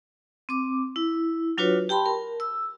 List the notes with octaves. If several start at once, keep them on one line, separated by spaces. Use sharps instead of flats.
C4 D6
E4
F#3 D4 F4 F#4 B4 C#5
G4 G5 A5 B5 C6
A#4
E6